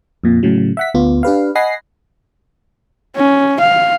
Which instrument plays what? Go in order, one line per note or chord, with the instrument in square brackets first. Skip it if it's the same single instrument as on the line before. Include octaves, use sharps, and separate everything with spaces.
[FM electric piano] F2 A#2
A2 C#3 F#3
E5 F#5 B6
D2 B3 F4
D4 G4 B4 F5
D#5 F#5 G#5 B5 A#6 C7
[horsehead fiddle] C#4
F5